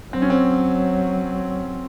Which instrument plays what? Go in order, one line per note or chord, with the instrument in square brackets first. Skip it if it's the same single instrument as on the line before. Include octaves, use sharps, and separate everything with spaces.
[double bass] F#3 [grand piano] C4
[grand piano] C#4
C4